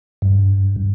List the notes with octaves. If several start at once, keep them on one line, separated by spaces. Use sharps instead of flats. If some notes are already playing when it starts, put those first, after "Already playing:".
G2